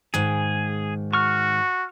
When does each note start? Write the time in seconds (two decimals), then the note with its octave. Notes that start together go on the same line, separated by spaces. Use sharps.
0.14 G#2 D#3 G#4
1.13 F#4 C#6 F6